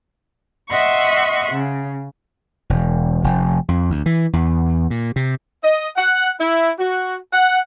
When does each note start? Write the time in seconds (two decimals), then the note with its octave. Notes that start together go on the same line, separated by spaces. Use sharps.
0.69 D#5 E5 F#5 C6 C#6
1.52 C#3
2.70 E1
3.24 F1
3.68 F2
3.90 D2
4.06 E3
4.33 E2
4.90 A#2
5.16 C3
5.64 D#5
5.97 F#5
6.40 E4
6.79 F#4
7.33 F#5